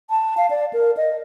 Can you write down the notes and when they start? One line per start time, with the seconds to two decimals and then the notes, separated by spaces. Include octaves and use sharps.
0.10 A5
0.37 F5
0.50 D5
0.73 A#4
0.97 D#5